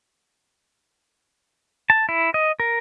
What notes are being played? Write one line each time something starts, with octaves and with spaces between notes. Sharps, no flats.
A5
E4
D#5
A#4